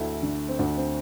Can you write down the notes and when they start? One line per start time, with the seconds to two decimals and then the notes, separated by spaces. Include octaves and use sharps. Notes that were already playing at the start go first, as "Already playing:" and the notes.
Already playing: D2 E4 A4
0.23 D3
0.49 C4
0.59 D2 D4
0.77 C4